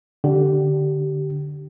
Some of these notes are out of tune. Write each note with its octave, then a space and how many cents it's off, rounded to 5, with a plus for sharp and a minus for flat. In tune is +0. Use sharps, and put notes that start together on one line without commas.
D3 +0 G4 -20